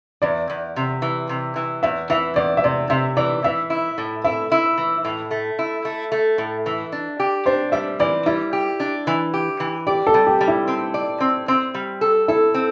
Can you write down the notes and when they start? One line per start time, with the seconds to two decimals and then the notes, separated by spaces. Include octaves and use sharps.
0.22 E2 D5
0.50 E2
0.76 C3
1.02 E3
1.29 C3
1.56 E3
1.83 E2 E5
2.10 E3 E5
2.36 E2 D5
2.57 E5
2.64 C3 D5
2.90 C3 E5
3.17 E3 D5
3.44 E3 E5
3.70 E4
3.98 A2
4.24 E4 E5
4.52 E4
4.78 E3
5.05 A2
5.31 A3
5.59 E4
5.85 A3
6.12 A3
6.38 A2
6.66 E3
6.92 D4
7.20 G4
7.46 D4 C5
7.72 G3 E5
8.00 E3 D5
8.26 G3 E4
8.53 G4
8.80 D4
9.07 E3
9.34 G4
9.60 E3
9.87 G4 D5
10.07 A4
10.14 G3
10.27 G4
10.41 G3
10.48 E4
10.68 C4
10.94 D5
11.20 C4
11.48 C4
11.74 G3
12.01 A4
12.28 E4 A4
12.54 C4